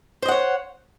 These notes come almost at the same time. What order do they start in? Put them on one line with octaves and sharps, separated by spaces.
C5 D#5 F#5 C#5